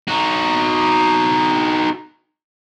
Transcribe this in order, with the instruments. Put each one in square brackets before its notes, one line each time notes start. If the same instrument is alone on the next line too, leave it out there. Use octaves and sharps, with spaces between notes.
[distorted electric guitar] D#4 F#4